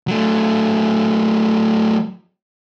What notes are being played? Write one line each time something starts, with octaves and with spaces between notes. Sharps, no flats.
F#3 A3